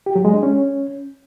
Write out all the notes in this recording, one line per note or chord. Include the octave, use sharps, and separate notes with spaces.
G4
F#3
G#3
D4
C#4